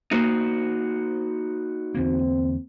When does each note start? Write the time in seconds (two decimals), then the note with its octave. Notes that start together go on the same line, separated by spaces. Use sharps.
0.11 A#3 D#4 F#4 C5 E6
1.95 E2 D3 A#3 C4